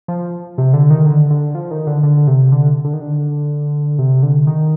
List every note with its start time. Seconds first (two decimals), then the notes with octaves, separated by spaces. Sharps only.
0.08 F3
0.58 C3
0.73 D3
0.90 D#3
1.06 D3
1.30 D3
1.55 F3
1.71 D#3
1.87 D3
2.03 D3
2.27 C3
2.52 D3
2.85 D3
2.93 D#3
3.00 D3
3.99 C3
4.23 D3
4.47 D#3